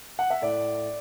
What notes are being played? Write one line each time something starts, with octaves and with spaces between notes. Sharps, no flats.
F#5
E5
A2 D5